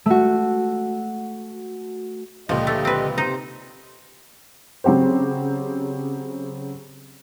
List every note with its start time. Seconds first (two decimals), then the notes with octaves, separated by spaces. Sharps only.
0.06 A3 F#4
2.49 C#2 A#2 D3 F3 G4 D#5
2.67 A3
2.85 C4 B4
3.18 C3 D#4 C5
4.84 C#3 F#3 C4 G4 C5